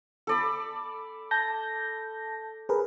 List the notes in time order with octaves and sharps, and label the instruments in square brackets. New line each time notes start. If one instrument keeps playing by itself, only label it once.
[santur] A4 D5 B5
[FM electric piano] A5 G6 A#6
G#4 A#4 B4